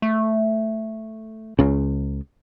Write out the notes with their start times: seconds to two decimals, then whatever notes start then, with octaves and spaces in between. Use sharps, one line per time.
0.02 A3
1.59 C#2 C#3